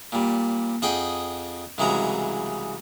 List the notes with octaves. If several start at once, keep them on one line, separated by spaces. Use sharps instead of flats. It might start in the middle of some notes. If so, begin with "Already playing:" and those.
A#2 G3
F2 G#4 D#5 F#5 G5
C2 C#3 E3 F#3 G#3 A#5